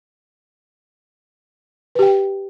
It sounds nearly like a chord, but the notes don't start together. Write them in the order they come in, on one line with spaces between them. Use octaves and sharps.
B4 G4 G5